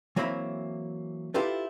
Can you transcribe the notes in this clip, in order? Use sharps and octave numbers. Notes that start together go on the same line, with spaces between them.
E3 F#3 A#3 C4 E4 B5
E4 F4 G4 A4 B4